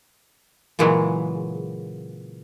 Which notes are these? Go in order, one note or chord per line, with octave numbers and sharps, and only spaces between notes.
A#2 C#3 E3 F#3 G#3